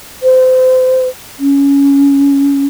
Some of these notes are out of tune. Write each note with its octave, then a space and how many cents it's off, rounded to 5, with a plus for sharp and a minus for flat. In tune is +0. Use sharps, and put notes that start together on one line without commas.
C5 -30
C#4 +10